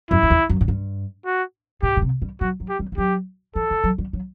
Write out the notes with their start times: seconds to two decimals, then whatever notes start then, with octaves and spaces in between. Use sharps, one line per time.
0.11 F#2 E4
0.23 F#2
0.30 E2
0.49 F#2
0.61 A2
0.68 G2
1.26 F#4
1.83 A2 G4
1.97 B2
2.02 C3
2.22 G3
2.41 F#3 F#4
2.60 F#3
2.69 G4
2.79 G3
2.92 E3
2.98 F#3 G4
3.55 E3 A4
3.70 D3
3.84 F#3
3.98 G3
4.13 F#3